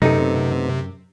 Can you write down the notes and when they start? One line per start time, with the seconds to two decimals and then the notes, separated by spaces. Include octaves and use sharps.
0.02 F#2 C3 A3 B3 D#4 A4